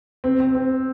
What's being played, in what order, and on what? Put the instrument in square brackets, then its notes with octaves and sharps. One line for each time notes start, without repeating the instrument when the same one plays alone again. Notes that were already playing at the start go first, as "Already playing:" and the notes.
[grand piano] C4
C4
C4